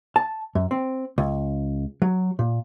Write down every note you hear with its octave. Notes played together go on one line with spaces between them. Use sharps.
A5
F#2
C4
C#2
F#3
A#2